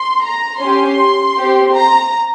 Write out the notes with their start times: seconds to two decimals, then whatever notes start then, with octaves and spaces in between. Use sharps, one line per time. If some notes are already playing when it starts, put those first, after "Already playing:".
Already playing: C6
0.24 A#5
0.61 C#4 G4 C6
1.37 C4 G4
1.75 A#5